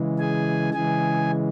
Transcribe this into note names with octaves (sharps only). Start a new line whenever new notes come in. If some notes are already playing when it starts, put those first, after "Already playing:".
Already playing: C#3 E3 G#3
G#4 G#5
C#3 E3 G#3 G#4 G#5